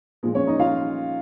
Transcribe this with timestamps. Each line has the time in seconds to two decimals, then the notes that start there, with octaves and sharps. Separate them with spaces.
0.23 A#2 F3 G#3
0.35 C#4 C#5
0.47 D#4 D#5
0.59 F4 F5